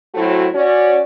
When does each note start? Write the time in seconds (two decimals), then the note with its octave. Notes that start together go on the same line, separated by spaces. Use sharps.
0.14 A2 F#3 A3 C4 E4 F#4
0.54 C#4 F#4 D5